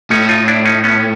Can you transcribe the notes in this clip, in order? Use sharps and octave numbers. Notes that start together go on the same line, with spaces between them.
A2 C#4 D#4
D#4 F4
D4 E4
C#4 D#4
B3 C#4